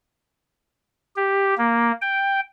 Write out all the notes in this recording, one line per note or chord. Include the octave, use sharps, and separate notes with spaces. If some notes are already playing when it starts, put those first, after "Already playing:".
G4
A#3
G5